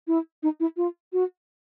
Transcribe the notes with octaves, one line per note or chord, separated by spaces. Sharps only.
E4
D#4
E4
F4
F#4